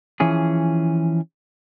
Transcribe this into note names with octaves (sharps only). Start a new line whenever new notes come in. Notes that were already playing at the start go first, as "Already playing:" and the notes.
E3 F3 C#4 G#4